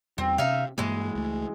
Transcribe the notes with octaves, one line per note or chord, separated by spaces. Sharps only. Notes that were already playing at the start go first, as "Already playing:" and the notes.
E2 G3 C4
C3 C#4 D#4 E5 F5
G2 E3 G#3 A#3
C#2 A3